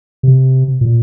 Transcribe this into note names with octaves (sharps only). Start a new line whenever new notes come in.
C3
A#2